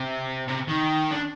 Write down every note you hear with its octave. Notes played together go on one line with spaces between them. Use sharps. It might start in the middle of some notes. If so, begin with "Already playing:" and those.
Already playing: C3
C3
D#3
D4